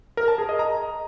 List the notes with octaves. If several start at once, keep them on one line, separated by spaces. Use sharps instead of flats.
A#4
A5
G#4
D#5
A#5